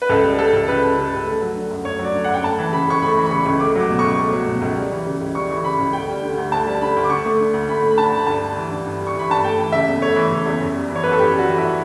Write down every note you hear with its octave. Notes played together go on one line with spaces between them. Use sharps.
B4
C#2 A4
G3
C#3 A4
C#2
C#2 B4
G3
C#3
C#2
A3
F#3
D3
F#2
A3 C#5
F#3
D5
D3
F#5
F#2
G5
A3 A5
E3
C#3 B5
C#2 C#6
A3 B5
E3
B5
C#3 C#6
C#2
A3 D6
F#3 D6
B2
C#6
C#2
A3
F#3
B2
C#2
G3
E3
C#3
C#2
G3 C#6
E3
C#3 B5
C#2
D2 G5
G3
D3
D2
D2 A5
G3
D3 B5
D2
D6
D2 C#6
A3
D3
D2
D2 B5
A3
B5
D3 A5
D2
B5
G2 A5
G3
E3
G2
G2
G3
C#6
E3 B5
G2 A5
A3 G5
E3
C#3 E5
E2
A3 C#5
E3
C#3
E2
F#2
G3
E3
C#5
F#2 B4
A4
F#2 G4
G3
F#4
E3
E4